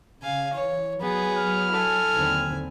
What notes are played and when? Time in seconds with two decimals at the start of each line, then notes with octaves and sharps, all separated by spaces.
0.22 C#3 F5 G#5
0.54 E3 C#5
1.01 F#3 B3 G#4
1.38 F6
1.72 E4 A4 G#5
2.13 D#2 D3 C4